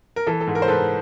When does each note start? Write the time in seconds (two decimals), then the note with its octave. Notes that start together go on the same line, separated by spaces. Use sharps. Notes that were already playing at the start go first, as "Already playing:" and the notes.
0.16 A#4
0.27 E3 A4
0.41 A4
0.47 G#2
0.55 A#4
0.62 C5
0.68 G#2 A4 B4